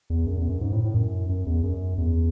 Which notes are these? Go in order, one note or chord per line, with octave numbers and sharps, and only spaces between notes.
E2
F#2
E2
F#2
G#2
A2
A2
F#2
F#2
E2
F#2
E2